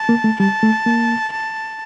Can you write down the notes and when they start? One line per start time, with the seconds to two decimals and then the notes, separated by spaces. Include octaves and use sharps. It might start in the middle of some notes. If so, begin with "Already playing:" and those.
Already playing: A5
0.09 A#3
0.24 A3
0.40 G3 A5
0.63 A3
0.86 A#3
1.33 A5